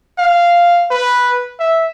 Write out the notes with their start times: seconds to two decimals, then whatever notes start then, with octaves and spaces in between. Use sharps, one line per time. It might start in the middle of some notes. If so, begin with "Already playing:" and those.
0.18 F5
0.91 B4
1.59 E5